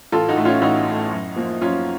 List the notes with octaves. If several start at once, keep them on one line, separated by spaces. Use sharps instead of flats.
A1 F4 A4
D#4 F#4
A2 A3
C#4 F4
A1 D#4 F#4
A2 A3
F#2
F3 A#3
F#2 C#4 F4